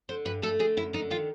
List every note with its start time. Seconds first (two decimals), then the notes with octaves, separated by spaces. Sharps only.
0.09 D3 C5
0.25 G2 B4
0.42 A3 A4
0.59 D3 G#4
0.77 F#2 E4
0.93 D3 D#4
1.10 D#3 F4